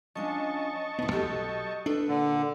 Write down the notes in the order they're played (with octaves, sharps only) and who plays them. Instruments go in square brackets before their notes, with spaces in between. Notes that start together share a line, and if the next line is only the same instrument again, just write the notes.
[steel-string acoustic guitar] F3 C#4 D4 [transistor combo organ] D#5 A5 C#6
[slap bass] D1 B3 [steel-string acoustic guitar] B2 E4
[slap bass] B1 [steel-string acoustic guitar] F#4 G4 A4
[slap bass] D4 [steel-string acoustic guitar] A4 B4
[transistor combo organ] A#2 [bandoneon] D3